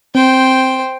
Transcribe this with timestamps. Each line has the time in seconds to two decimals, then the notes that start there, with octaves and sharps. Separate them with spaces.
0.15 C4 C5 G5